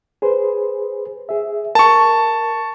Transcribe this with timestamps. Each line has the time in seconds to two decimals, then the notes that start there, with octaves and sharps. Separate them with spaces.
0.22 G#4 B4 C5
1.29 G#4 E5
1.75 A#4 A5 C#6